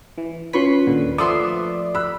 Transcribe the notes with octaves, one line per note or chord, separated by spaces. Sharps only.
E3
C#4 F4 B4 C#5 C6 C#6 B6
D#2 A#2 D3
F3 A3 B3 D5 E5 C6 D6 D#6
B5 E6 F#6